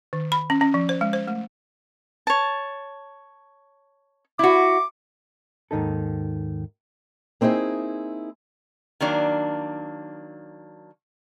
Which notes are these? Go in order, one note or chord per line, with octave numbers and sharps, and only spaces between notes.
D#3
B5
C#4
C#4
F3
C5
G#3
C5
A3
C#5 A5
E4 F#4 D6
D#2 G#2 D#3 D#4 A4
A#3 C4 D#4 E4 G#4
D#3 F#3 A#3 D4